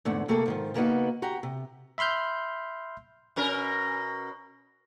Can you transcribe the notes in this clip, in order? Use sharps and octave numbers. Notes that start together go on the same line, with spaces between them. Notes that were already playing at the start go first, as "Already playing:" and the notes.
E2 G#2 D3 A3
C3 A3 A#3 G#4 A4
G#2 D#3 F3
C#3 A#3 B3 D#4 F#4
F#4 G4 A#5
C3
E5 B5 C6 F6 G6
B2 C#4 A#4